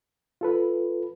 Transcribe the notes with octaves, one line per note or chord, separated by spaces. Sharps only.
F4 A4 B4